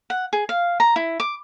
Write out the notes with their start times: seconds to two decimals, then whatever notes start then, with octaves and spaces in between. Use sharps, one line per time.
0.10 F#5
0.33 G#4
0.49 F5
0.80 A#5
0.96 E4
1.20 D6